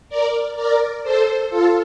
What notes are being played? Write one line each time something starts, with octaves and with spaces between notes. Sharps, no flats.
A#4 D5
A#4 D5
A4 C5
F4 A4